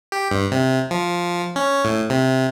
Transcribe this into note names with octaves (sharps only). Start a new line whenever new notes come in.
G4
G2
C3
F3
C#4
A2
C3